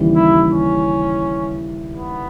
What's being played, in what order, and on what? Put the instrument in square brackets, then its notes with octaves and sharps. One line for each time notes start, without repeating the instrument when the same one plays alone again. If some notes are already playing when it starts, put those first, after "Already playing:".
Already playing: [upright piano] D#2 C#3 E3 G3
[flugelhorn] E4
C#4
B3